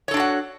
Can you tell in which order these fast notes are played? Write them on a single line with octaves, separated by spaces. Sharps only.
C#5 A4 D4 F#4 F#5